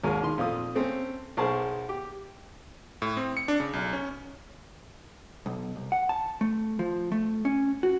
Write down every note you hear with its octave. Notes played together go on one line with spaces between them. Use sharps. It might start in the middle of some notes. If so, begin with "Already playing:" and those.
G#1 D#2 G#3 A#4 C#5 G#5
D#3 C6
F2 A#2 A3 D#6
A3 C4 C#4
B1 G#4 A#4 C5 A5 C#6
G4
A2
C4
C#7
D4
C#3
B1
C#4
B1
C2
F#5
A5
A3
F3
A3
C#4
F#4